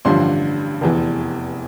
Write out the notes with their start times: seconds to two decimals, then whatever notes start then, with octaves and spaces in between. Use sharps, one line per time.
0.05 A1 G2 D3 F3 C6
0.81 F1 E2 E3